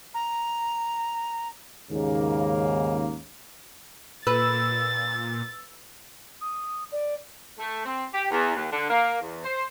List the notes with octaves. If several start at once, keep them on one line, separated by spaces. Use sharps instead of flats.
A#5
D#2 G#2 C#3 A#3
A#2 B4 E6 A6
D#6
D5
A3
C4
G4
E2
D#2
D3
A#3
E2
C5